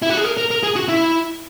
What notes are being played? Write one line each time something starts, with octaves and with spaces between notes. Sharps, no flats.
E4
F#4
G#4
A#4
A#4
A#4
G#4
F#4
E4